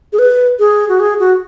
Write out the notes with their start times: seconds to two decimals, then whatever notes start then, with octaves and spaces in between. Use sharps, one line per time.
0.13 G#4
0.19 B4
0.59 G#4
0.89 F#4
1.00 G#4
1.20 F#4